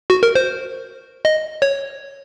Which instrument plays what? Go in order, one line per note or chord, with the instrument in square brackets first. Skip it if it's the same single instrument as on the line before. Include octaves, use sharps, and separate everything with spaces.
[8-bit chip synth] F#4
A#4
C5
D#5
C#5